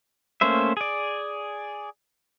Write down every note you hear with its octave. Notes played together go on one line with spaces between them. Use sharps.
A3 A#3 C#4 C5 E5
G#4 D5